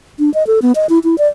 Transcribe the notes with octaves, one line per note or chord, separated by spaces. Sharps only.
D4
D#5
A4
B3
D#5
E4
E4
D5